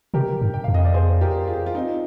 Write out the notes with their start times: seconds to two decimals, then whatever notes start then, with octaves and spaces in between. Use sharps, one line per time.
0.14 C3 G4 A#4
0.41 G2
0.54 G5
0.64 F2 F5
0.74 D#5
0.84 D5
0.94 G#4 C5
1.21 G4 A#4
1.47 F4 G#4
1.66 F4
1.75 C4 D#4